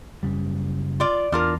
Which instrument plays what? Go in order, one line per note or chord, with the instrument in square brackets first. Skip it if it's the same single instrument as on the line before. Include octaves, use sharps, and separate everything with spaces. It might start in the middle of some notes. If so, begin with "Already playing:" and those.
[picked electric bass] F#1 C#3 G3
[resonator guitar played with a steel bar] F4 D5
[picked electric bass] E2 [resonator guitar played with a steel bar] D4 F4 A#4